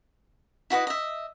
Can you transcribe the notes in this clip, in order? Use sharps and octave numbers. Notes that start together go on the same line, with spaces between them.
E4 F#4 B4 D#5
D#5 E5